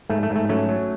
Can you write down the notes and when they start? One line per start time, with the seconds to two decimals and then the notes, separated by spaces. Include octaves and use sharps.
0.09 G#2 A3
0.23 A3
0.30 G#2
0.36 A3
0.49 F#3 A3 C#4
0.69 F#3